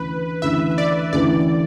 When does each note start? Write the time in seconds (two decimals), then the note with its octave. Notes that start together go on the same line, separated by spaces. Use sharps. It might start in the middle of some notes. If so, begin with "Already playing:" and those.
Already playing: D2 C#3 E3 B4
0.42 D2 C#3 E3 E5
0.78 D5
1.12 D2 C#3 E3 D5